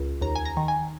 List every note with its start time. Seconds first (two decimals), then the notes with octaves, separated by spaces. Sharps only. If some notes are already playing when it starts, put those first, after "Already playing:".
Already playing: C#2
0.21 D#2 A#5
0.35 G#5
0.45 A#5
0.57 D#3
0.68 G#5